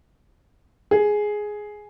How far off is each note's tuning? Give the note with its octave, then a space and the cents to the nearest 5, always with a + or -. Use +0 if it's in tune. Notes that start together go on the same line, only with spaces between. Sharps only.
G#4 +5